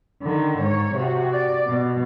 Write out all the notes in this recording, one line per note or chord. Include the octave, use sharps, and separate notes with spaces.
D3 D#3
G#2 C#5
C3 F#4
D5
B2